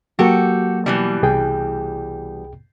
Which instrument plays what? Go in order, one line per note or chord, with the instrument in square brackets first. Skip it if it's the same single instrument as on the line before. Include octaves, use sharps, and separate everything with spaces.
[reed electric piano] F#3 A#3 [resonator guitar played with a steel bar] F#4 G4 A4
[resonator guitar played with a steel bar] B2 E3 G3
[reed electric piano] C2 G#4 G5